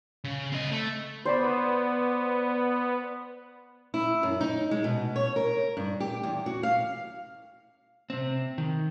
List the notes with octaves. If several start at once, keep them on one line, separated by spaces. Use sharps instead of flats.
C#3
C4 D#5
A3
B3 C5 D5 B5
E4
F#2
D#4
G#3
B2
C#5
A#4
G2
G4
E2
F#4
F5
C3 C4
D#3